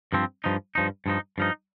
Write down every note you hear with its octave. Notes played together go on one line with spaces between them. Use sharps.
G2 F3 C4
G2 F3 D#4
G2 F3 D#4
G2 F3 D#4
G2 F3 D#4